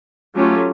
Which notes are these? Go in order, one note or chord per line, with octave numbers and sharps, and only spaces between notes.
F#3 A3 C#4 F4 G4